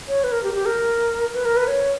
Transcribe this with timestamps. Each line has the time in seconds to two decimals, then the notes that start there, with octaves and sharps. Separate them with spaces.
0.08 C#5
0.24 B4
0.32 A#4
0.43 G4
0.54 G4
0.66 A#4
1.34 B4
1.45 A#4
1.57 B4
1.67 C#5